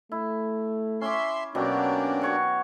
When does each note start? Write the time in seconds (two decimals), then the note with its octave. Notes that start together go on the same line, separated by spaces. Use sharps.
0.12 A3 E4
1.01 C#4 E5 C6 D6
1.55 B2 F#3 A#3 C#4 D4 G4
2.22 F#4 C#5 F#5